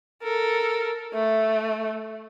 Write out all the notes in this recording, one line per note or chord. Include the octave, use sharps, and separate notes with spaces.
A4 A#4
A3